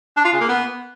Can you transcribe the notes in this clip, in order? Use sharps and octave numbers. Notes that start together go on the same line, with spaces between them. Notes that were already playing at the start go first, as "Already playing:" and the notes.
D4
F4
C#3
A#3
B3